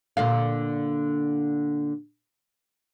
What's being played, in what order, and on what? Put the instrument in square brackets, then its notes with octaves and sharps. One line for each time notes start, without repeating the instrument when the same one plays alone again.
[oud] A#2 D3 F5